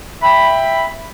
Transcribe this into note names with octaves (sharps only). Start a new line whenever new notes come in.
E5 G5 B5